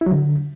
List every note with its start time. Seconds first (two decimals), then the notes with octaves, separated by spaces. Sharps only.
0.01 E4
0.06 F#3
0.11 D3